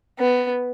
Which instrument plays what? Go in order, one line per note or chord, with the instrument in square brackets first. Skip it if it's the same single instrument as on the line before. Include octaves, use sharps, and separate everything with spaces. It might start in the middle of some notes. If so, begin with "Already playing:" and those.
[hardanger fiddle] B3